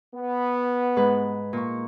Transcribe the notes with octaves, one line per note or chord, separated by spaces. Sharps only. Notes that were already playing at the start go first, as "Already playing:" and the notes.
B3
G#2 B4
A#2 C#6